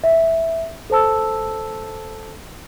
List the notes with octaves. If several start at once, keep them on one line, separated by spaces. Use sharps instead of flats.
E5
A4 C5 A5 E6